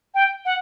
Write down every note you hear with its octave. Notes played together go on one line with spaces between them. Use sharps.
G5
F#5